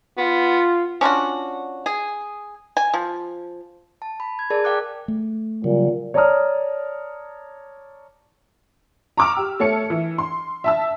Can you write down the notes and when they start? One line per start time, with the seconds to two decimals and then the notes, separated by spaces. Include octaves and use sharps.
0.18 B3 F4
1.01 C#4 D4 F4 F#4
1.86 G#4
2.77 G#5
2.94 F3
4.02 A5
4.20 B5
4.39 G#6
4.50 G#4 A#4 D5 A5
4.64 A#4 F5 G5 D6 F#6
5.08 A3
5.64 A#2 C#3 F#3 G3
6.14 C#5 D5 A5 A#5 D#6 F6
9.17 A#5 C#6 D6 E6 F6
9.37 G4
9.60 A3 C#5 A5 C#7
9.90 E3
10.18 C6
10.64 E5 A5 E6